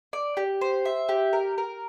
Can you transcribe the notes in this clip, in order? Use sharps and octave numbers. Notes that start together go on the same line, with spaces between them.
D5
G4
C5
E5
G4
A#4
A#4